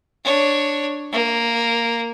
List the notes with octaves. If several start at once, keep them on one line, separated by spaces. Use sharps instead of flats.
D4 C#5
A#3